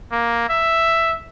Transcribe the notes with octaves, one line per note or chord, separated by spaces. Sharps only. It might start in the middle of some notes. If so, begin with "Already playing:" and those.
A#3
E5